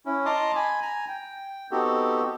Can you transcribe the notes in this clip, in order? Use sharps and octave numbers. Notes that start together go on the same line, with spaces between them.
C#4 E4
D#5 A5 A#5 C6 D6 D#6
G#5 B5
G#5 A#5
G5
B3 C4 D#4 F#4 G4 A4